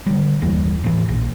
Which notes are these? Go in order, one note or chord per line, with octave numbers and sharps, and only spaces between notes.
D3 G3
F#1 D#2 E3 G3
A2 C3 E3
A#1